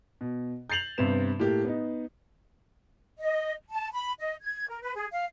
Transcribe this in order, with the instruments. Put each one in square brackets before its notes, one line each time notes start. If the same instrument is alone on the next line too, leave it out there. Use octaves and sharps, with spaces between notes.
[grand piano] B2
G6 A6 C7 F7 F#7
G2 C3 B3 B4 E7
A2 A#3 G4
B3 D#4
[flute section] D#5
A5
B5
D#5
G#6
A#4
B4
G#4
F5